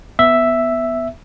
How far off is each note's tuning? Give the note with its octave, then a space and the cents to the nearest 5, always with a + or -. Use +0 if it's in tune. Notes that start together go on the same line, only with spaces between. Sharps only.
B3 +0 E5 +0